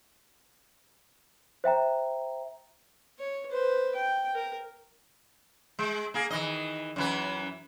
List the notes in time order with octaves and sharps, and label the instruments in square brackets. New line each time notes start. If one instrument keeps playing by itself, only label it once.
[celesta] C5 E5 G5 A#5
[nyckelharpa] C#5
B4 C5
G5
A#4
[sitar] G#3
A#3 G#4
D#3 E3 D#5
F#2 E3 B4